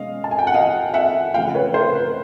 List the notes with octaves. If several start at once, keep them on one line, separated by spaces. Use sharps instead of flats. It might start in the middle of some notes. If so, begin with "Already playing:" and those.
Already playing: B2 G#3 C#4 D#5 F5
A5
G#5
G5
F#5
D#5 F5
E5 F#5
C#3 F3 A3 F5 G5
B4 C#5
A#4 C5
B4